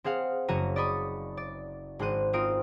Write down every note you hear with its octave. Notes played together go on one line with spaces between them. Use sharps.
C4 G#4 F5 F#5
F#1 F#3 F#4 A#5 D#7
D5 D#5 B5 C#6 D#6
D5
G#1 G#3 C5 F#6 D#7
C4 F4 A#4 D#6 D7